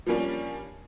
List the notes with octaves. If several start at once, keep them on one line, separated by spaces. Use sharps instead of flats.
F3 G3 A#3 C#4 D4